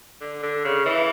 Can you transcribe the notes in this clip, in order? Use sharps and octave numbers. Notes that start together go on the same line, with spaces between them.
D3
D3
C#3
E3